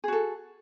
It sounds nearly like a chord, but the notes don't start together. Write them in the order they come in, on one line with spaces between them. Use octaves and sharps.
G#4 F#4 A4